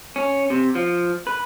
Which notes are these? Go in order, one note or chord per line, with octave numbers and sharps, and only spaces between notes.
C#4
C3
F3
B4